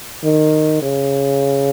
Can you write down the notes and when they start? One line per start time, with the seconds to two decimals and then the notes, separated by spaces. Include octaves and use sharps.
0.24 D#3
0.82 C#3